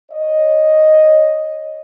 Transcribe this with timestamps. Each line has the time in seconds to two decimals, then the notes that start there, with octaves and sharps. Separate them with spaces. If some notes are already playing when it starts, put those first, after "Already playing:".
0.10 C#5 D#5